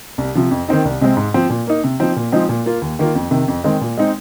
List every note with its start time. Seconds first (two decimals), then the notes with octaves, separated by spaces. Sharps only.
0.18 C2
0.35 C3 F3
0.51 F2
0.68 D#3 C4 D#4
0.85 C2
1.01 C3 G#3 C4
1.17 G#2
1.34 F3 C4
1.50 A#2
1.67 A#3 D#4
1.84 C3
2.00 F3 C4 D#4
2.16 A#2
2.32 F3 G#3 C4 D#4
2.49 A#2
2.66 A#3 F4
2.82 D#2
2.99 D#3 A#3 F4
3.15 F2
3.31 C3 D#3
3.48 F2
3.64 D#3 G#3 C4
3.81 A#2
3.97 G#3 C4 D#4